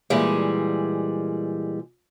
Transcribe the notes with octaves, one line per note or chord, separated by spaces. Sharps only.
A#2 E3 G3 G#3